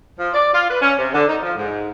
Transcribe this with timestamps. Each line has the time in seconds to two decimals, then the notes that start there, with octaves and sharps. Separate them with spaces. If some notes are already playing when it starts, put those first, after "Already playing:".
0.18 F3
0.33 D5
0.53 F4
0.68 B4
0.81 C#4
0.98 C3
1.13 D3
1.28 D#4
1.43 F3
1.56 G#2